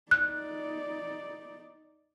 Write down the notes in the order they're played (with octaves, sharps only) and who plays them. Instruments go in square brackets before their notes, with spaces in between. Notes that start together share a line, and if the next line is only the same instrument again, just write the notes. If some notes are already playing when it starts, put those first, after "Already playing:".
[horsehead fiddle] D#4 D5 [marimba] F#6